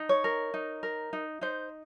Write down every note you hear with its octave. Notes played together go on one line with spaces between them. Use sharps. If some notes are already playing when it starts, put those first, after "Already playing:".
Already playing: D#4
C#5
A#4
D#4
A#4
D#4
D#4 C5